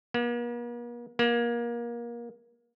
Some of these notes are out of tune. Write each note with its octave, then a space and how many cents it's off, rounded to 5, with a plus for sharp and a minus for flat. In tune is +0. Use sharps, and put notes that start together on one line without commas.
A#3 +45
A#3 +25